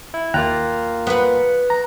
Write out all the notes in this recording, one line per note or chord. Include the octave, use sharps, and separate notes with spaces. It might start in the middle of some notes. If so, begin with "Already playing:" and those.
E4
D#2 A#3 F4 G5 A#5 F#6
B3 B4
A#5